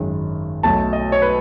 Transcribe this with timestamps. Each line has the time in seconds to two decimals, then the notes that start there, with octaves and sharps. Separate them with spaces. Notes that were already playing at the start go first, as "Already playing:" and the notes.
Already playing: G#1 F#2 D#3 G#3
0.63 B1 B2 F#3 A3 A5
0.93 D#5
1.12 C#5
1.22 B4